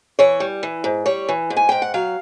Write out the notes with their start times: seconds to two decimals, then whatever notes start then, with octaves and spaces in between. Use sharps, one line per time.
0.19 E3 C#5
0.40 G3
0.63 E3
0.84 G#2
1.06 G3 C#5
1.29 E3
1.50 G#2
1.57 G#5
1.69 G#2 G5
1.82 F#5
1.94 F#3 F5